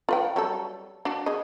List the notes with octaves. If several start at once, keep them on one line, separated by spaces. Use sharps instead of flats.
F4 B4 G5
F#3 G3 A4
D4 F#4
G#4 D#5